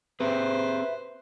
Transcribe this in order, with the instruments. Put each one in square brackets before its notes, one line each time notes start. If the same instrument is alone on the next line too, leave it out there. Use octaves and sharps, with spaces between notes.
[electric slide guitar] C4 G4 G#4 [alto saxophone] B4 [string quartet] C5 [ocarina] E5